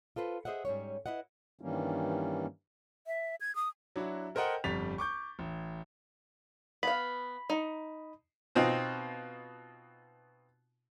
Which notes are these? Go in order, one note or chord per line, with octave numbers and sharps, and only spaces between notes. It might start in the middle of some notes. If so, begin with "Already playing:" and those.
F4 A4 B4 C5
G#4 C5 D#5 E5 F#5
G#2 G3 C#4 C#5
E4 B4 D#5 F#5
G2 D#3 E3 G3 A#3 C#4
E5
G#6
D#6
F#3 D4 E4 F#4
A4 A#4 C5 D#5 F#5 G5
G1 F2 G3 A6 B6 F7
C#6 D6 G6
A1
B3 F5 B5
D#4
B2 C4 D#4 F4